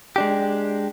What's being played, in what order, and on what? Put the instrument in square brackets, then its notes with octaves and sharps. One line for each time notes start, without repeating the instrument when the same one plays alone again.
[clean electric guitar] G#3 D4 G4